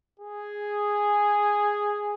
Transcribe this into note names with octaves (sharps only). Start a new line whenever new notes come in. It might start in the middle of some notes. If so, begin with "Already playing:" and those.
G#4